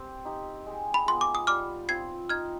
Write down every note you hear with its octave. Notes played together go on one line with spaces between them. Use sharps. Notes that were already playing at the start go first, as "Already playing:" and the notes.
Already playing: C4 G4 C5
D#4 G4
G#3
B5
B3 F4 G#4 C6
D6
D#6
G3 D6 F6
C4 F4 G#6 C7
D#4 F6 G#6